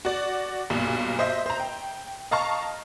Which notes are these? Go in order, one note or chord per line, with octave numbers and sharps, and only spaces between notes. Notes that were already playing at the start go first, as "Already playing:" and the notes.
F#4 D5
B1 G2 A#2
C5 D#5 E5
C5 A#5
G5
D#5 F5 A5 A#5 C#6